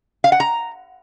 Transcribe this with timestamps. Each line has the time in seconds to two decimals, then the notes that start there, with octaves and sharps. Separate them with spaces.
0.24 F5
0.32 F#5
0.40 A#5